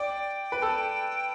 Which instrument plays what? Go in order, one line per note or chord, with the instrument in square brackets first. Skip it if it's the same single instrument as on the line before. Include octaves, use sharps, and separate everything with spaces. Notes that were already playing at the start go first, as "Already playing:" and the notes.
Already playing: [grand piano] D5 [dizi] G5
[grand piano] B4
A4